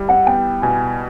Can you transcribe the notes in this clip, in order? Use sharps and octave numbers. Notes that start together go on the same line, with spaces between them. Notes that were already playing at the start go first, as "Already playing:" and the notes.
Already playing: G3 E4
F#5
B3 G5
B2 G#5